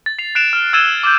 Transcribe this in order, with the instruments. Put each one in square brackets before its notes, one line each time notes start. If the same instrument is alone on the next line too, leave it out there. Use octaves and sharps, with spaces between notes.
[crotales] A6
C7 F7
F#6 C7 D7 E7 F7
F6
E6 G#6 A6 D#7 E7 G7
D6 G6